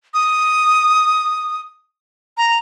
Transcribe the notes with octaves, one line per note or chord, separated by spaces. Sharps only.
D#6
A#5